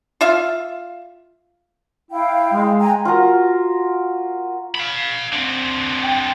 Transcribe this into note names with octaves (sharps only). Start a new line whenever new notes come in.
F4 E5 F5
E4 F5 G5
G#3
G5 G#5 A#5
F4 F#4 A#4 A#5
F5 B5
D3 C4
G5